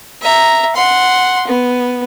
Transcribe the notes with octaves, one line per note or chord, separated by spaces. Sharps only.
E5 A#5
F#5 C6
B3